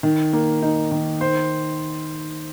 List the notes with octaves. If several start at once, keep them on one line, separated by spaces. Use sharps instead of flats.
D#3
A#3
D#4
D#3
C5